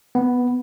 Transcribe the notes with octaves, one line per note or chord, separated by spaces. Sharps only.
B3